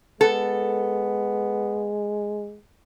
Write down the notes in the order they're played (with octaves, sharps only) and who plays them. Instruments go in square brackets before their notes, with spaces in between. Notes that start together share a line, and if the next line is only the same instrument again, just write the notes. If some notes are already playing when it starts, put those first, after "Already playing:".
[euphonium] G#3 [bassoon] B3 [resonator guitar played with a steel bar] A4